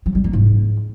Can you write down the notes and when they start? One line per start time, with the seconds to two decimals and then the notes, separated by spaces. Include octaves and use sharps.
0.06 F#3
0.15 G3
0.24 A#3
0.33 G#2